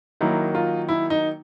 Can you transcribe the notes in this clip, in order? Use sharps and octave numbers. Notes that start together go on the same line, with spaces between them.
D#3 F#3 A#3 E4
F4
E4
D#4